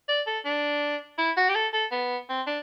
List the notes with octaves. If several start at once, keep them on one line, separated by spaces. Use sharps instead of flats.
D5
A4
D4
E4
F#4
G4
A4
A4
B3
C4
D4